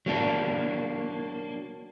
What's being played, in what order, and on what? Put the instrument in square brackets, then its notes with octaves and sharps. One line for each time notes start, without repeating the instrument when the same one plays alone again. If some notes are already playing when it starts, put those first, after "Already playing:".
[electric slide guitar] F#3 A#3 D4